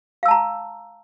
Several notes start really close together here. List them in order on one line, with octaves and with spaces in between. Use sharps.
F5 E6 A5 A#5